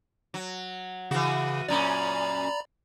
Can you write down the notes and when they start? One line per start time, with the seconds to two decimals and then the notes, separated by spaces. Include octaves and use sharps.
0.34 F#3
1.11 C#3 E3 F#4
1.68 F#2 A#2 C#4 D5 A#5 B5